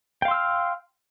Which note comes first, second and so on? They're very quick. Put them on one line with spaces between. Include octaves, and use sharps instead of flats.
G5 F5 C6 E6 F6